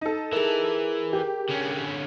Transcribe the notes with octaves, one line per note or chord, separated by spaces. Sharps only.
D#4 A4
E3 G#4 A#4
G4
D3 C#4